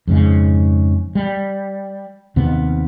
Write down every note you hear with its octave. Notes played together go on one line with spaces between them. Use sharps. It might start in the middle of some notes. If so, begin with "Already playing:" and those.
F2 G#2 C#3
G3
D#2 C3 B3